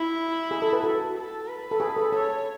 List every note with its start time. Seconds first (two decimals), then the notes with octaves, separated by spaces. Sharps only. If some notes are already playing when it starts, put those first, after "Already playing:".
Already playing: E4
0.51 G#4
0.62 A4
0.73 B4
0.84 F#4 A4
1.16 A4
1.48 B4
1.71 A4
1.80 G#4
1.96 A4
2.12 A4 C#5